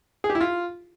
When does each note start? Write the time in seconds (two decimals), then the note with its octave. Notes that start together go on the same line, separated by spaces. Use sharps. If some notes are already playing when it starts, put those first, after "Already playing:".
0.24 G#4
0.30 G4
0.35 E4
0.41 F4